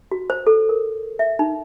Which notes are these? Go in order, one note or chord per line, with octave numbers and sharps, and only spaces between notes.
F#4
C5
A4
A#4
E5
D#4